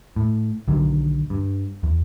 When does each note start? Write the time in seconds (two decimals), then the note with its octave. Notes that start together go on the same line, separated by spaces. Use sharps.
0.16 A2
0.68 B1 D3 D#3 F#3
1.30 G2
1.83 E2